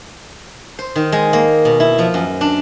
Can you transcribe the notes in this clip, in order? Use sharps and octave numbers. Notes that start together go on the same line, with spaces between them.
C5
D#3
G#3
A#3
B2
E4
F3
F#2
D4